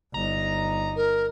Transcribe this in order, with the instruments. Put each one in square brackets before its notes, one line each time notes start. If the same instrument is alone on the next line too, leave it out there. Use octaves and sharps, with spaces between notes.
[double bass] G1 D#4 [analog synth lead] A#5
[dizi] A#4